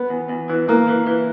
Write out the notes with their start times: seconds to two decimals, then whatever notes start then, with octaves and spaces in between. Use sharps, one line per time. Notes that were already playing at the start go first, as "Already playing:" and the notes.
Already playing: B3
0.10 E2
0.29 E2
0.50 E3
0.68 E3 A#3
0.88 E3
1.07 E3